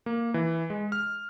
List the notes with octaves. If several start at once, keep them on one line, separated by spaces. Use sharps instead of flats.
A#3
E3
G#3
F6